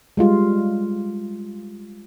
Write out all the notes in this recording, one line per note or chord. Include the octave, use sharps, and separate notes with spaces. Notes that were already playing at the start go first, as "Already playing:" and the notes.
G3 G#3 F4